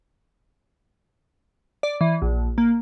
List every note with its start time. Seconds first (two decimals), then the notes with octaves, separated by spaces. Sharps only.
1.83 D5
2.01 E3
2.22 A#1
2.58 A#3